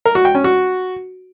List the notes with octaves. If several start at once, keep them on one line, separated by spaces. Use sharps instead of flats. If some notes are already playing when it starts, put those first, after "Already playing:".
A#4
F#4
G5
C#4
F#4